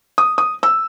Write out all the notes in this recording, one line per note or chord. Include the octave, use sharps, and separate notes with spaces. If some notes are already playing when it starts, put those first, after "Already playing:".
D#6
D#6
E6